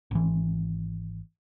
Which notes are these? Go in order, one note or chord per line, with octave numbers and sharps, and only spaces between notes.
G#1 E3